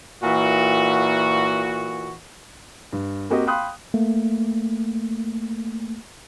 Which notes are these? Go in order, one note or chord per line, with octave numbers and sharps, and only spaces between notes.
A#2 E3 F#4
G2
A#3 C4 F#4 G4 D#5
F5 G5 B5 C6 D#6 F#6
A3 A#3